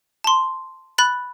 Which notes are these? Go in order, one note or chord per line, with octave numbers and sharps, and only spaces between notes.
A5 C6
B5 F#6 A6